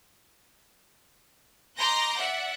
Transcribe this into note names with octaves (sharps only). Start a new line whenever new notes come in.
D#5 A#5 C6 D6 G6 A#6
D5 E5 F#5